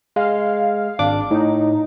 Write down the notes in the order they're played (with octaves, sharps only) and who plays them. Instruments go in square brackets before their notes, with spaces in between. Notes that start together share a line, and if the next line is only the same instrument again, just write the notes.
[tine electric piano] G#3 [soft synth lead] F5
[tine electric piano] G#1 D4 D6
[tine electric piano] A2 [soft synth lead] D#4